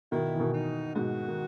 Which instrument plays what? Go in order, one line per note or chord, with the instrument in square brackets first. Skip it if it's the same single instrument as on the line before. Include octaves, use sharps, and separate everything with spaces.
[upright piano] B2 D#3 [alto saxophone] E4
[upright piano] E3
B2 D#3
[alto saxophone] D#4
[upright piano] G#2 B2 [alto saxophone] F#4
[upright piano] D#3